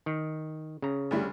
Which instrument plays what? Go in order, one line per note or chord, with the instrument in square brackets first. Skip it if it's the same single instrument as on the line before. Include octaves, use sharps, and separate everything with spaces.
[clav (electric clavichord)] D#3
C#3 A#5
[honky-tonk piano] D2 G3 A3